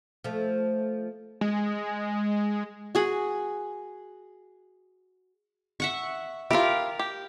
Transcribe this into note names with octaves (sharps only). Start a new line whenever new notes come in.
F3 A3
G#3
F#4 G#4 F#5
E5 F#5 C#6
E4 F4 G4 A#4
G4